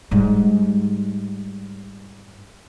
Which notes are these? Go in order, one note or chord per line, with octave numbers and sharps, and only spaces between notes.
G#2 G3